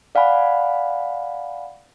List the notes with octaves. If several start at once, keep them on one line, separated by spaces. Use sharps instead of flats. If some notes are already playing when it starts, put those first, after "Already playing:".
D5 F5 F#5 G#5 B5